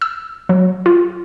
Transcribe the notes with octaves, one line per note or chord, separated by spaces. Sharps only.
E6
F#3
F4